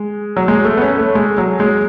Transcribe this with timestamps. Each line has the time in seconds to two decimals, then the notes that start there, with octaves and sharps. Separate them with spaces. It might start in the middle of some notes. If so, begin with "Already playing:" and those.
Already playing: G#3
0.37 F#3
0.48 G#3
0.64 A3
0.77 B3
0.82 C#4
0.98 A3
1.15 G#3
1.38 F#3
1.60 G#3